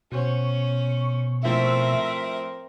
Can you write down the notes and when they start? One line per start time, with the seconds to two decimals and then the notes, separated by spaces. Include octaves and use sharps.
0.12 B2 C#4 F#4 C5 C#6
1.43 A2 F3 C4 A#4 E5